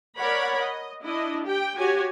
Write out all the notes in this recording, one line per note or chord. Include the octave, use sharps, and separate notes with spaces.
A#4 C#5 D5 F#5 B5
D#5
D4 E4 D#5
G4 G5
F#4 G4 C#5 G#5